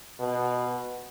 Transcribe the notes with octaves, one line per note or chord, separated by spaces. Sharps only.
B2